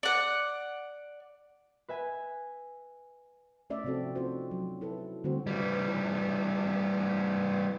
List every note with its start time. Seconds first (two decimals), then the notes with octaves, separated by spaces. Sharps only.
0.03 D5 F#5
1.88 B4 E5 G#5
3.70 A3 C#4 D5 E5
3.84 C3 F3 C4 F#4 A4
4.15 C4 C#4 D#4 F4 F#4 C5
4.51 F#3
4.81 E4 A4 B4
5.24 D3 G3 A3 C4 F#4 C5
5.47 E3 G3